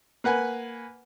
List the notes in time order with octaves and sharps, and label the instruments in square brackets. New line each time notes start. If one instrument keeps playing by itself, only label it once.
[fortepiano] A#3 B4 F#5 G#5